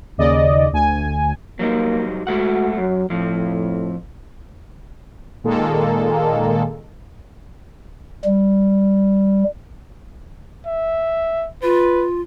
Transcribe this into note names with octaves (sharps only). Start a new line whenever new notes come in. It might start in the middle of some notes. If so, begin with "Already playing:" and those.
D#2 C#3 D5 D#5
D2 G#5
F#3 G3 A#3 D#4
G#3 A3 F#4 F#5
F#2 F#3
F2 A2 F3
A#2 D#3 G#3 A#3 A4
G3
E5
F4 B4